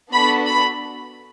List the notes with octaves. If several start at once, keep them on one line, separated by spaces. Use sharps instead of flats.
B3 D4 F#4 A4 B5
B5